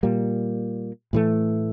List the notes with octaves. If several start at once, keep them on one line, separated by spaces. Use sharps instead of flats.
A#2 G3 A#3
A2 E3 A3